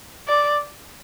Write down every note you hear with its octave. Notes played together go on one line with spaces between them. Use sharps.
D5